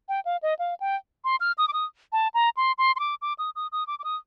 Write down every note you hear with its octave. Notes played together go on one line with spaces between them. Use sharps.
G5
F5
D#5
F5
G5
C6
F6
D#6
D6
D#6
A5
A#5
C6
C6
C6
D6
D6
D#6
D#6
D#6
D6
D6
D#6